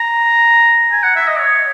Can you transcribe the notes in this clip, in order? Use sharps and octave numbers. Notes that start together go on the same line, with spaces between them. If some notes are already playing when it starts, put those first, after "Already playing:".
Already playing: A#5
G#5
F#5
E5
D#5
C#5